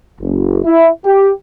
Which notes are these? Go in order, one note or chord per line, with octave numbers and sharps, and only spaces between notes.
F#1
E4
G4